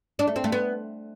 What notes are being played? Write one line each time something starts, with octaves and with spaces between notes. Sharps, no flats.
D4
A3
C4
A3
B3